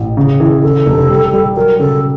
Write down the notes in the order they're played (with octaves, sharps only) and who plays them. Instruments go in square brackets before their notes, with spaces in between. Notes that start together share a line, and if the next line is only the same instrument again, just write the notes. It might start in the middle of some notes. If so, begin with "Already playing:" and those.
Already playing: [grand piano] A1
[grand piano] C#3 [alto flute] G#4
[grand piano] E3
[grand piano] C#3 [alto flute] A4
[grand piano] F1
G3
G3
[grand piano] F#3 [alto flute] A#4
[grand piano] C#3 [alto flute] A4